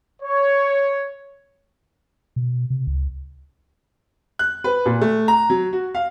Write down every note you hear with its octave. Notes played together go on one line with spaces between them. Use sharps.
C#5
B2
C3
C#2
F#6
B4
A#2
A3
A#5
F#3
F#4
F5